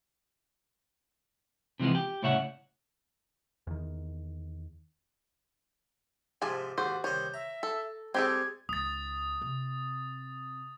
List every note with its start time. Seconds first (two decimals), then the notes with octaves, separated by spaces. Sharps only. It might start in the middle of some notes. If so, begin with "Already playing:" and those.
1.80 C3 E3 F3 G#3 B3
1.95 G4
2.22 C2 A2 C#3 C#5 E5 F#5
3.67 E2 D#3
6.42 G#2 C3 F3 G#5 A5
6.78 D#2 G#2 F#4 C5
7.04 C2 D#3 C5 C#5 G6
7.34 E5 A#5
7.63 A4
8.14 G3 G#3 C4 G4 A4 G#6
8.69 C#2 D#3 D#6 A6
9.42 C3